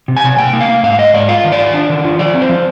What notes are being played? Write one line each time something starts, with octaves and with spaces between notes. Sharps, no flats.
C3
G#5
C3
A#3 G5
A#3
F5
A#3
G#2 F5
G#2 D#5
G#2 D5
F4 F5
D#3
D5
F4
D4
D#3
F4
F3 D5
C4
C5
F3